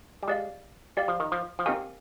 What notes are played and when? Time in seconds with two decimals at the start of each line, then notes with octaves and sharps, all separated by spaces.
0.23 G3
0.28 G#3 G4 D5 F5
0.97 G3 G4 D5 F5
1.08 F3
1.20 D#3
1.32 F3
1.59 F3
1.66 D#3 C4 G4 A#4 F5 G#5